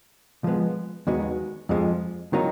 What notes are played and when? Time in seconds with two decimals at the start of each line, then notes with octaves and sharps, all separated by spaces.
0.44 F3 G#3 B3
1.07 D#2 D#3 G#3 B3 F#4
1.69 F2 F3 G#3
2.33 D#3 F#3 A#3 D#4